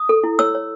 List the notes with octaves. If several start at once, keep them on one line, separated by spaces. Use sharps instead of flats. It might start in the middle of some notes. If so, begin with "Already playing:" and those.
Already playing: D#6
A4
E4
C#5 E6
C#5